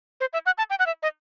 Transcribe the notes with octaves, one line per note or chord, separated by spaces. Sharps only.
C5
E5
F#5
A5
G5
F#5
E5
D#5